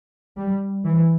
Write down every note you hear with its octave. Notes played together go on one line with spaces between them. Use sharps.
G3
E3